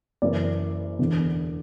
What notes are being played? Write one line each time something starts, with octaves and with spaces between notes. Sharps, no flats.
F#1 F#2 E3 D5
E1 E2 D3